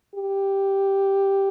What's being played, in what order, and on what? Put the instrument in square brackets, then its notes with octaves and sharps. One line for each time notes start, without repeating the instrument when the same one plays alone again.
[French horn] G4